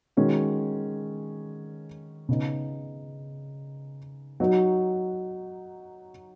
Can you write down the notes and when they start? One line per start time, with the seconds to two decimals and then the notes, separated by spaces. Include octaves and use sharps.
0.17 D#3 G#3 C#4 F#4
2.29 C#3 B3 D#4
4.40 F#3 D#4 F#4